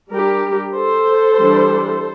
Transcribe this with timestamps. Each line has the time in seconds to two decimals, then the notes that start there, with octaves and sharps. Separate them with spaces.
0.12 G3 D4 G4 A#4
0.75 A4 C5
1.39 E3 G3 D4